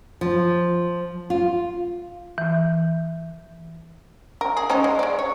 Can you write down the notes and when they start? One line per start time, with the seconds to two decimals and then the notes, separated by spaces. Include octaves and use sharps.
0.21 F3
1.30 F4
2.38 E3
4.41 A#4
4.57 G#4
4.70 G#3 C#4 D#4
4.84 G#3
4.99 G#3 D5
5.19 C#5